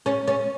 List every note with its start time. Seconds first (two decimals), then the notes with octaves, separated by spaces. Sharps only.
0.06 C#4
0.27 C#4